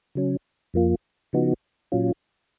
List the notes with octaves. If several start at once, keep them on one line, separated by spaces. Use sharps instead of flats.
C#3 F#3 C#4
F2 F3 A#3 F4
C#3 F3 B3 D#4 F#4
A#2 F#3 C#4 F4